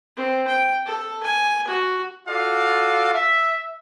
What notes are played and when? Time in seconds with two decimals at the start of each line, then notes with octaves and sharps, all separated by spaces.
0.17 C4
0.48 G5
0.86 A4
1.23 G#5
1.68 F#4
2.27 F4 F#4 A4 D5 F5
3.13 E5